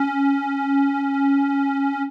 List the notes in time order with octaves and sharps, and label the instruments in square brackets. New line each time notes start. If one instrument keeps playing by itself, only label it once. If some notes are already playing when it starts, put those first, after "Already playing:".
Already playing: [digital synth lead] C#4